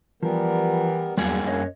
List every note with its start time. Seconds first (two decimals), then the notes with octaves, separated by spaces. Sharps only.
0.23 E3 F3 G3 B3 A#4
1.17 E2 G2 F#3 A#3 G#4
1.47 F#2 C#5 D#5